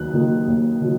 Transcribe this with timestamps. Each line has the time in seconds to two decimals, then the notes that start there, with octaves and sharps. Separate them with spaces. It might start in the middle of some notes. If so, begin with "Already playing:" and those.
Already playing: D#2 D#3 F#3 A#3 F#6
0.14 D#3 F#3 A#3
0.48 D#2
0.81 D#3 F#3